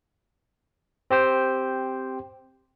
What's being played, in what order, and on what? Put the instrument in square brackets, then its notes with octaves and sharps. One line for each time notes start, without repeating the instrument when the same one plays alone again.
[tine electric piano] C4 G4 C5 G5